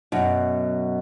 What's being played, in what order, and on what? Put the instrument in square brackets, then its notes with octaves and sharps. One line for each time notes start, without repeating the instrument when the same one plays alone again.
[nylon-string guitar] F#2 B2